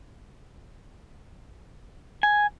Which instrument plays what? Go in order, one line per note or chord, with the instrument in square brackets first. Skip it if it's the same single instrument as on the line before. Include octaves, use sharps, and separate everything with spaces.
[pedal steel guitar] G#5